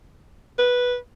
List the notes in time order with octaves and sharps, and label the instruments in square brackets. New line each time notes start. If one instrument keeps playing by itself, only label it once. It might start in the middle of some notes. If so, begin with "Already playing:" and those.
[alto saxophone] B4